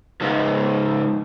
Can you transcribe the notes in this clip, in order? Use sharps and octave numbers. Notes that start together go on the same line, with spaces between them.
C#2 G#2